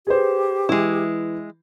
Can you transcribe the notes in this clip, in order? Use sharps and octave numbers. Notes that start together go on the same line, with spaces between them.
G4 G#4 B4 C5
E3 G#3 E4